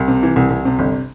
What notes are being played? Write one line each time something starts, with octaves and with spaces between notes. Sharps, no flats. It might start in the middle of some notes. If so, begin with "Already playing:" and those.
Already playing: C2
C3
E3
C2
C2
C3
G1